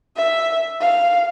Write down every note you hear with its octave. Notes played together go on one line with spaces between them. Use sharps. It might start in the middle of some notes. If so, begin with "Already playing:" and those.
E5
F5